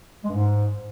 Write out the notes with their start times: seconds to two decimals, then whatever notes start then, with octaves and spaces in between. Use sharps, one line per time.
0.24 G#3
0.29 G2
0.34 G#2